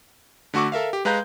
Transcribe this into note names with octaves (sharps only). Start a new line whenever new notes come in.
D3 A3 F#4 C#6 D6
A4 A#4 E5 F5
G4
G#3 B4 F5 A#5 G6